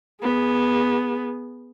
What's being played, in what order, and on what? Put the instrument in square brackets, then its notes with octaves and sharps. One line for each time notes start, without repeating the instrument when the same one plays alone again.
[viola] B3 G#4